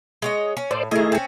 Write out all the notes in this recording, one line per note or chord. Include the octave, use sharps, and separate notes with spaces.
G#3 C#5 D#5
C#4
A2 C5 D5
D#3 A3 E4 G#4 D#5
C4 C#4